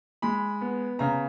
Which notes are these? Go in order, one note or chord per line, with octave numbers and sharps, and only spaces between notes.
G#3 B5
B3
C#3 A#5